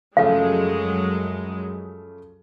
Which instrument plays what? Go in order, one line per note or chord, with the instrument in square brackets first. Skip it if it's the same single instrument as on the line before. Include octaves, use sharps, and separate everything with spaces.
[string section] F#2 F#3 G#3 [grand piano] C#3 F3 A3 [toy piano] F5